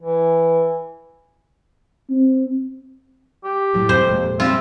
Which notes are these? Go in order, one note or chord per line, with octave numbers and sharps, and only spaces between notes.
E3
C4
G4
E1 A2 F#3 G3
F2 C3 C5
A#2 F3 G#3
G3 C4 F4 G4 E5